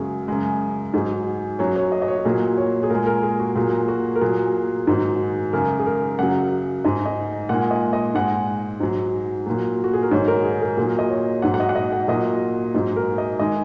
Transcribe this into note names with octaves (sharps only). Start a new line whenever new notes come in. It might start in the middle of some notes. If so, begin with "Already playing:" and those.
Already playing: F#2 C#3 G#3 F#4 G#4
F#2 C#3 G#3
G#2 F#3 G#4
F#2 F#3 C#5
C#5
D#5
D#5
C#5
F#4
A#2 F#3 G#4
C#5
G#4
A#2 G#3 A#4
A#4
G#4
F#4
A#2 F#3 G#4
F#4
A#4
A#2 F#3 G#4
G#2 D#3 F#3
F#2 C#3 G#3 A#4
G#4
A#4
F#2 C#3 F#3 F#5
G#2 G#3 D#5
D#5
A#2 G#3 F#5
D#5
D#5
G#2 G#3 F#5
G#2 F#3
A#2 F#3
F#4
G#4
A#4
G#2 D#3 F#3 C#5
A#4
G#4
A#4
A#2 F#3 G#4
D#5
C#5
G#2 F#3 F#5
F#5
D#5
F#5
D#5
F#5
A#2 F#3 D#5
G#2 F#3 D#5
A#4
D#5
D#3 G#3 D#5